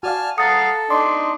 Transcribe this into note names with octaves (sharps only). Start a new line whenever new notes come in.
F#4 D5 F5 G#5 A5 F6
A4 F5 F#5 A#5 D#6 A6 C#7
D4 D#4 C6 D6